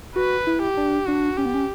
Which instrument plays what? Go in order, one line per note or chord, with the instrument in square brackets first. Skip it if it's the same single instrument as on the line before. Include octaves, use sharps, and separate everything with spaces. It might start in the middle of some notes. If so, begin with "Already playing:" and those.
[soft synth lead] F#4 [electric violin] B4
[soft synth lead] E4
[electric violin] G4
[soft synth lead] D4
[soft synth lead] D4 [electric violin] F#4
[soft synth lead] C#4 [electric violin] G4
[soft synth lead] B3
C#4